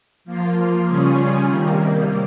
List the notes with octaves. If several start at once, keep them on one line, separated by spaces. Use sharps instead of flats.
F3 A#3 F4
C#3 G3 C#4 F4 G#4
C3 D#3 G3 A#3